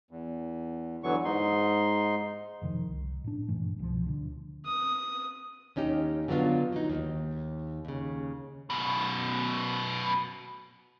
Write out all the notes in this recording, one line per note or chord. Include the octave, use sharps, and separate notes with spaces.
E2
E2 D3 E3 F#3 B3 C#6
G#2 D#4 C6
F1 C3 D#3 F3
C2
A2 D4
G2 A#2 E3 A3
C2 B2 D3 F3
D2 D3
D#6
D#2 C#4 D#4 G4
D3 F#3 B3 F4
F#3 D#4
D#2
D#2 C#3
F#2 B2